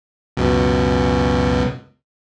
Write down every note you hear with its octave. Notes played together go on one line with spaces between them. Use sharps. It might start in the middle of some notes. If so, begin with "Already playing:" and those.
C#2 F#2 B2